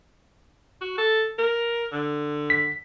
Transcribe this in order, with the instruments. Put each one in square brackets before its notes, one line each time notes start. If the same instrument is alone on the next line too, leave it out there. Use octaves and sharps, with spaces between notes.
[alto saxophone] F#4
A4
A#4
D3
[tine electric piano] B6